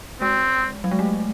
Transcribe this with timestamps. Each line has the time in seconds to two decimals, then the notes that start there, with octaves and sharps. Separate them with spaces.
0.21 G#3 C4
0.84 F#3
0.91 G#3
0.99 A3